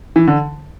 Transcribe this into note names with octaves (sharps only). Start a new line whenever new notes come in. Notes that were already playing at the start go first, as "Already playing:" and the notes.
E3
D3